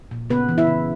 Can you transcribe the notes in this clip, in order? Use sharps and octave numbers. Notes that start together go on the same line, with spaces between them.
A#2
C#3 B3 B4
E3
E4 E5
C#3